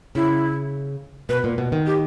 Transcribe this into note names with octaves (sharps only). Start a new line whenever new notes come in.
C#3 E4
B2 B4
A#2
B2
D#3
G4